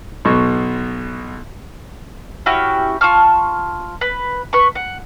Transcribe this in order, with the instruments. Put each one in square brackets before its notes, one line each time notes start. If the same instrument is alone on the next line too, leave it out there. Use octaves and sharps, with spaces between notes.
[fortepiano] B1 B2 C#6
[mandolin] C#4 E4 F#4 G4
F4 A5 C#6 F6
B4
B4 C#6
F#5